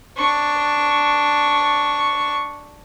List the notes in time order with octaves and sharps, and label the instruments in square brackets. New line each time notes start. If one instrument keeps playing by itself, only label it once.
[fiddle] D4 C#6